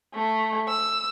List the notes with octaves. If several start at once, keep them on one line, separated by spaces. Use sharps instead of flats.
A3
E6